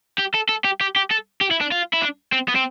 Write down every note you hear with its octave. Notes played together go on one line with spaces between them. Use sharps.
G4
A4
A4
G4
G4
G4
A4
G4
E4
D4
F4
E4
D4
C4
B3
C4